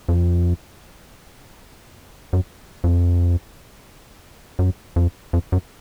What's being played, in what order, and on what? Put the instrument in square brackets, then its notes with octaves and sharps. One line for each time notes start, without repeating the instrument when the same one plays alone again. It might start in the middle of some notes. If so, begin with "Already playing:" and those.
[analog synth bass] F2
F#2
F2
F#2
F2
F2
F#2